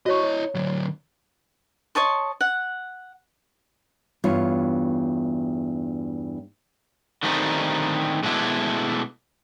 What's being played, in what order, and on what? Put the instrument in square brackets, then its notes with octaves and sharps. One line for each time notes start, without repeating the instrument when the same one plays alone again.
[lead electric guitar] E4 D#5 [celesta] F#4 C#5 C#6
[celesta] C#5
[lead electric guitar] D3 F#3
[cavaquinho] C#5 D#5 A5 C6
F#5
[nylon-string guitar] E2 G2 F4 C#5
[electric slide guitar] D3 D#3 G3 A3 C4 D#4
B2 G#3 A3 B3 D4 E4